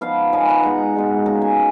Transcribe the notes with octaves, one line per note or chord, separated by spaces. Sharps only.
F3 B3 D#4 F5
F3 B3 D#4 G#5
F#5
B2 G#3 D#4 A#5
B2 G#3 D#4
B2 A#3 C#4 F4 A#5
G#5